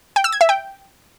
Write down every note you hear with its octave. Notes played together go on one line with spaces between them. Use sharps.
G5
E6
G#6
E5
G5